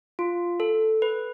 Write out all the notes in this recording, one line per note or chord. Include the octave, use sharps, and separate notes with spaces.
F4
A4
B4